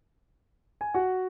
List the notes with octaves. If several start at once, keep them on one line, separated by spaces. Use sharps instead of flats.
G#5
F#4 F#5